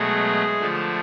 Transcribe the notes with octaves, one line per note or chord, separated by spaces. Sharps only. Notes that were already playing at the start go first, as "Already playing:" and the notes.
Already playing: B2 F#3 G#3 A3 G#4
D3 F3 A3